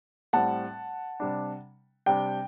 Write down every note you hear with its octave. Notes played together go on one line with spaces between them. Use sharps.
A2 G3 C4 F#5 A5
C3 G3 D4
C3 G3 D4 G5